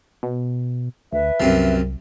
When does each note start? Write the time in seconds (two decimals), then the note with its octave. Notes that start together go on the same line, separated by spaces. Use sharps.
0.23 B2
1.13 D2 B4 E5
1.40 C2 F#2 C3 F3